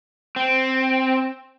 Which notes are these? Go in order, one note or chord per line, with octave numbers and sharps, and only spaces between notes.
C4